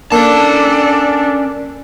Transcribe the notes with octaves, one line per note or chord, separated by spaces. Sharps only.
A#3 C#4 D4 A4 D5 A5